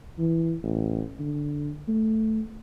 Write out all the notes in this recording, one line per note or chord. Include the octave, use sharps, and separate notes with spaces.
E3
A1
D3
A3